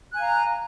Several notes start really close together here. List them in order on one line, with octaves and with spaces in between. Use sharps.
F#6 G#5 F5 A#5